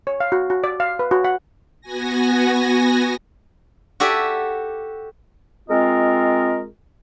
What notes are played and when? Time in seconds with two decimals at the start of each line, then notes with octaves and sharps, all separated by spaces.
0.07 C#5
0.20 F5
0.32 F#4
0.50 F#4
0.64 D5
0.80 F5
0.99 B4
1.11 F#4
1.25 F#5
1.81 B3 F#4 G#5 A#6
4.00 F#4 G4 A4 D5 E5 G#5
5.69 G#3 C4 F4 A#4 D#5